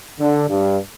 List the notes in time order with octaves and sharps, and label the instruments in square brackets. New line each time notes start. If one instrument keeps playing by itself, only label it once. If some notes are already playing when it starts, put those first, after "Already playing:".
[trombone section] D3
G2